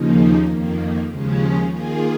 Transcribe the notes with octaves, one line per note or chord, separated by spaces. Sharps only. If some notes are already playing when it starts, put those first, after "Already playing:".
Already playing: D#2 C#3 F3 A#3 D#4
F2 D#3 A#3
D#2 C#3 F3 G#3 C#4
D#3 A#3 F4 G#4